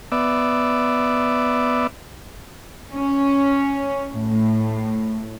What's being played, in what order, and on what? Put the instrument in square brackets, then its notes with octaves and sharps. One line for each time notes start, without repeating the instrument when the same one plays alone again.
[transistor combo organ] B3 D5 E5
[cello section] C#4
A2